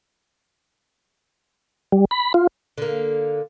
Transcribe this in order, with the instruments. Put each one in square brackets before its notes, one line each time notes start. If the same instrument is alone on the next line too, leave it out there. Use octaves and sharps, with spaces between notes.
[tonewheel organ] G3
B5
F4
[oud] D3 A#3